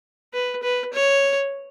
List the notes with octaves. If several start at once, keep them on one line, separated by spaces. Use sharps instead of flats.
B4
B4
C#5